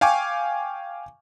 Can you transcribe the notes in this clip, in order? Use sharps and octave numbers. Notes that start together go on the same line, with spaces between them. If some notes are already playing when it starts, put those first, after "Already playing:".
F5 G5 G#5 C#6 D6